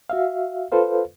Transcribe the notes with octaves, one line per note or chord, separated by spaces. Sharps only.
F#4 E5 F5
F4 A4 B4 C5 F5